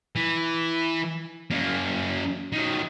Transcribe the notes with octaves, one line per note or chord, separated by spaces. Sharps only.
E3
F#2 A#3
D#3 F#3